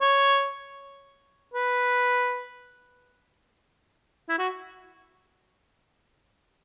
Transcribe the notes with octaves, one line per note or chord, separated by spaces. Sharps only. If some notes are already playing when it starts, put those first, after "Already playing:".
C#5
B4
E4
F#4